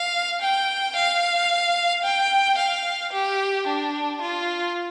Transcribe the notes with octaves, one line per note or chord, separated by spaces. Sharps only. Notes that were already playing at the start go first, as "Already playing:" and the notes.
Already playing: F5
G5
F5
G5
F5
G4
D4
F4